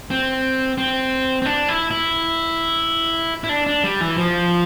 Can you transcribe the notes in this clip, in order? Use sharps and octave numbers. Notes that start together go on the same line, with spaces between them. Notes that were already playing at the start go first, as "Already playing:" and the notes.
C4
C4
C4
D4
E4
E4
E4
D4
D4
G3
E3
F3